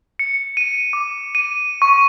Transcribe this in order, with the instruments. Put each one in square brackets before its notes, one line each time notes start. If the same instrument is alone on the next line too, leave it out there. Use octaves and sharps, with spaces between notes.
[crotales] C#7
D#7
D6
D#7
C#6